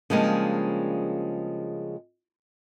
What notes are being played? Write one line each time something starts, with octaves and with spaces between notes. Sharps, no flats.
C#3 F3 G3 G#3 A#3 D4